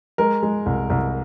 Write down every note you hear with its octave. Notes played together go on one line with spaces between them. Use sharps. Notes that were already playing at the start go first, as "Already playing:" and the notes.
G#3 A#4
G#3
C2
C2